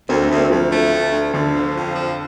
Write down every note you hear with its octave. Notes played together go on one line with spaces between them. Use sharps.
D2 C4
A3
D2
C4
D2 F3
A3
D2
D2
D2 D3
F3
F2
F3